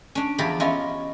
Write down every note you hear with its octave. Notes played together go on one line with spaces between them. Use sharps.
C#4 D4
E2 F3 G4 D5 A#5 B5
C#4 E4 F4 D#5